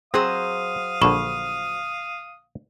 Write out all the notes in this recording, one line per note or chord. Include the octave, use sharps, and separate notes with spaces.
F#3 C4 G#4 C5 F5 D#6
A#1 D3 B5 C#6